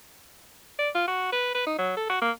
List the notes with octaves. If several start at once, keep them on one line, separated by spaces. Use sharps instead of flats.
D5
F4
F#4
B4
B4
D#4
F#3
A4
F#4
A#3